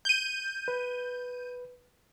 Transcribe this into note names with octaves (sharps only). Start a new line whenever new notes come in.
G6 D#7
B4